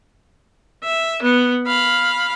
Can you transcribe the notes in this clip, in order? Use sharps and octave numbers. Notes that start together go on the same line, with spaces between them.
E5
B3
F5 B5